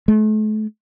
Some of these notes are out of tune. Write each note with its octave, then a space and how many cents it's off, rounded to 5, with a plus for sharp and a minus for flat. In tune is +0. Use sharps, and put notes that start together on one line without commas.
A3 -40